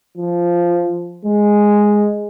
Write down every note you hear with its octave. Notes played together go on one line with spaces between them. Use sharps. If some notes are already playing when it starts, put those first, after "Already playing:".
F3
G#3